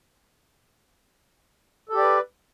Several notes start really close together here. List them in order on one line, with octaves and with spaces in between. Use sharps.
A4 G4 D5 B4